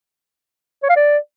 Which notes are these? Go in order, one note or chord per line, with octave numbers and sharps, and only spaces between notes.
C#5
F5
D5